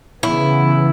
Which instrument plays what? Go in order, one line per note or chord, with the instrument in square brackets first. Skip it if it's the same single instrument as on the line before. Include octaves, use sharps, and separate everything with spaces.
[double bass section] C#3 E3 B3 [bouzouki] E4